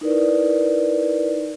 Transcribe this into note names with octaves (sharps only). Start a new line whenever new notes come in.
D#4 E4 A#4 B4 D5